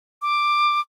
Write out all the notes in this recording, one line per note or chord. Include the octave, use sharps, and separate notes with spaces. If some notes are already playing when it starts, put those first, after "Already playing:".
D6